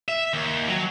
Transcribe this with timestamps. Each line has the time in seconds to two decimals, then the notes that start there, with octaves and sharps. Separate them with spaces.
0.08 E5
0.34 D#2
0.68 F#3